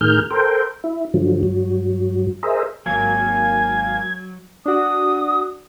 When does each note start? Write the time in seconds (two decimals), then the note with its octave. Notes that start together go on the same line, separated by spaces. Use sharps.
0.01 A2 D#3 G#4 A#4 F6 G6
0.31 A4 A#4 C5 G5
0.84 E4
1.14 G2 D3 F3 F#3
1.43 G2 F#3
2.43 G#4 A#4 C5 D#5 E5
2.86 G#1 F#3 A#3 G#5 G#6
4.66 D4 F#4 D#6